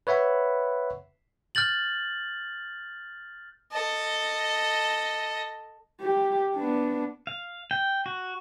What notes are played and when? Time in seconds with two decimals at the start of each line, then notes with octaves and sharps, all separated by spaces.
0.07 B4 C#5 E5 F#5 B5
1.55 F6 G6 A6 F#7
3.72 A4 D#5
6.01 G4
6.56 B3 D4
7.27 F5
7.71 G5
8.06 F#4